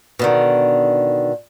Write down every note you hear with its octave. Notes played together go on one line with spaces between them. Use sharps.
B2 D3 D#3